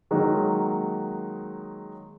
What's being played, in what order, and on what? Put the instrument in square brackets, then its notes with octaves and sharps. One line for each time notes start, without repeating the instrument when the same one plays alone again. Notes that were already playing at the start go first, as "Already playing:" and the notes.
[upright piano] D#3 F#3 G#3 A#3 D#4